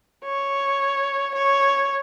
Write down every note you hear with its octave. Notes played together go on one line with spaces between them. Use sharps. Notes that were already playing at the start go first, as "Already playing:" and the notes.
C#5
C#5